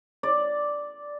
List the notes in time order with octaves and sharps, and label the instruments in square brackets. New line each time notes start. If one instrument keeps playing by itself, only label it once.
[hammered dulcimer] D5